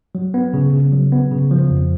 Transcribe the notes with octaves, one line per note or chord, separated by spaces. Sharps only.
F#3
B3
C#3
C#3
F#3
B3
C#3
F3
F2